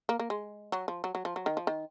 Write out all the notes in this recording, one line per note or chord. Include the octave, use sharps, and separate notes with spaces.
A#3
A#3
G#3
F#3
F3
F#3
F#3
F3
F#3
D#3
F3
D#3